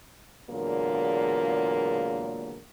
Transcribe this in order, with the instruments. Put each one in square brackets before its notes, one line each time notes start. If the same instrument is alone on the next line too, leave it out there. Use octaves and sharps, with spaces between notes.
[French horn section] E2 A#2 D3 F#3 G#3 A#3